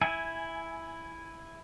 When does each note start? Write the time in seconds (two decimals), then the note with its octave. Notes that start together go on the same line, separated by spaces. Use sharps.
0.01 E4 G#5